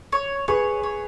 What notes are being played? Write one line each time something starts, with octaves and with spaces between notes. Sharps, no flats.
C#5
G#4 B4 C#5
C#5